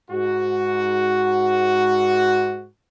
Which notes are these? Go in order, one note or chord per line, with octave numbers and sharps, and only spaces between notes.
G#2 F#4